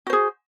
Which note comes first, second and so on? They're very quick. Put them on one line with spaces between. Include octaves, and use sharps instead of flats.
F#4 C5 G#4